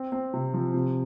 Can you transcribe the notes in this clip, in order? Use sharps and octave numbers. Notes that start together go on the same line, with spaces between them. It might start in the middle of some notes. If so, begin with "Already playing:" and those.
Already playing: C4
C4
C3
F3
C3